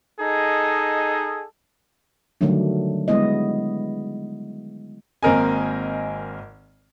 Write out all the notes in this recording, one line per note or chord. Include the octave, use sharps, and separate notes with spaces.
D#4 G#4 A4 D#5
D3 D#3 F#3 G3 A3 D4
G3 G#3 B3 E4 D#5
G#1 A#3 C4 A#4 D#5 G#5